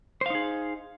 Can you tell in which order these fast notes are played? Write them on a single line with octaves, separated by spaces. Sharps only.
C5 F5 D#4 G#4